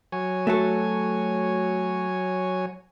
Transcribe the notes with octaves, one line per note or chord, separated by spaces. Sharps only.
F#3 C#5 G#5
A3 F#4 A4